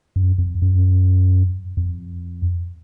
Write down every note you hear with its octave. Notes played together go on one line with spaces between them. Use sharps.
F#2
F2
F#2
F2